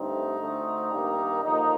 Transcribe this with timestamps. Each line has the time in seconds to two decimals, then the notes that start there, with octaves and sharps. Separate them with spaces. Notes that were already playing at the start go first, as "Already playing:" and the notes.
Already playing: G2 D3 A3 C4 D#4
0.40 D2 D3 A3 C4
0.91 G2 D#3 G3 A#3
1.42 D#2 D3 F3 A#3 D#4